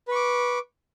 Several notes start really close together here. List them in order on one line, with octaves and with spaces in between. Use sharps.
B4 C#6 D6